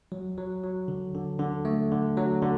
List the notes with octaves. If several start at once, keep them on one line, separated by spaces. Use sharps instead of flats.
F#3
F#3
F#3
D3
D3
D3
A3
D3
F#3
D3